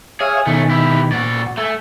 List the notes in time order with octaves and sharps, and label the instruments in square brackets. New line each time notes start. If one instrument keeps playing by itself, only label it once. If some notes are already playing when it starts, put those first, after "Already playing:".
[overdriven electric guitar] G#4 [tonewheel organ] C#5 E5 F5
[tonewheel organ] B2 D#3 [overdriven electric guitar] A3 C#4
[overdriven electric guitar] E4 G4
[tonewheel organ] A#2 [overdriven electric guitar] F#4 D5
[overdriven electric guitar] A3 [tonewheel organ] G#5 A5